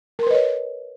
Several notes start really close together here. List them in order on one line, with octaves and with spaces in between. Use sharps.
A#4 C6 B4 D#5 C#5